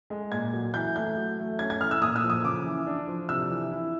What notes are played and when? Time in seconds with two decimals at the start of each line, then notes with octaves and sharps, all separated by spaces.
0.10 G#3
0.32 A#2 G#6
0.53 F#3
0.74 E3 G6
0.95 A3 G6
1.17 F#3
1.39 A3
1.59 C#4 G#6
1.70 G#6
1.81 E3 F6
1.91 E6
2.02 A#2 D#6
2.16 E6
2.23 F3
2.30 D#6
2.44 C#3 D6
2.66 E3
2.87 D4
3.07 F3
3.29 C3 E6
3.50 E3
3.72 E4